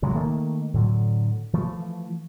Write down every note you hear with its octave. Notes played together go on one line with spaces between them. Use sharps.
D2 C#3 F#3 G#3
D#3 A3 A#3
A2 D3 F#3
E3 F3 A3